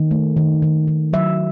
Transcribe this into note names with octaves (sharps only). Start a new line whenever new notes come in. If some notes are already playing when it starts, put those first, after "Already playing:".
Already playing: D#3
A3
D#3
D#3
D#3
F#3 E5